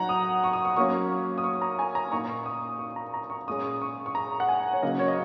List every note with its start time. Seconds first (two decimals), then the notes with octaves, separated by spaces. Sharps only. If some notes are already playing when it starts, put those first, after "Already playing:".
Already playing: F#3 D#4 F#5 A#5
0.09 D#6
0.44 C#6
0.53 D#6
0.65 C#6
0.76 F#3 A#3 C#4 C#6
1.38 D#6
1.44 C#6
1.62 A#5
1.79 G#5
1.95 A#5
2.12 A#2 A#3 D#4 C#6
2.46 D#6
2.79 C#6
2.96 A#5
3.14 A#5
3.30 C#6
3.48 A#2 G#3 C#4 D#6
3.82 C#6
4.06 C#6
4.15 A#5
4.40 F#5
4.49 G#5
4.73 C#5
4.82 C#3 F#3 A#3 D#5
4.99 C#5
5.08 D#5